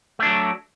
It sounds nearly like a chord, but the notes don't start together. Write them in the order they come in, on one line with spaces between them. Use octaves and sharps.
A3 D4 F#3